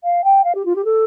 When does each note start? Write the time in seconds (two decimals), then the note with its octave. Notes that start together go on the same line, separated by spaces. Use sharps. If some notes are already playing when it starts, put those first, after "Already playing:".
0.04 F5
0.24 G5
0.44 F5
0.55 G4
0.65 F4
0.76 G4
0.85 A4